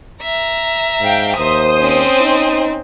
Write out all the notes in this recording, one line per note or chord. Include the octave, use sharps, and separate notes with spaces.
E5 A#5
G#2 F5 G5
D#2 C5 D#6
C4 C#4
D#4